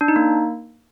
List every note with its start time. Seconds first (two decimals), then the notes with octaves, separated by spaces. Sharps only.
0.01 D4
0.08 D#4
0.16 A#3